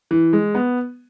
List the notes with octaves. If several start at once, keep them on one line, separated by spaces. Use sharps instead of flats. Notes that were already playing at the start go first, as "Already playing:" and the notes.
E3
G#3
B3